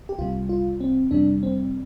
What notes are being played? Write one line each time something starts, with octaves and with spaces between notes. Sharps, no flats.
G4
C2 C3 G3 F4
F4
C4
F2 C3 G3 D4
C4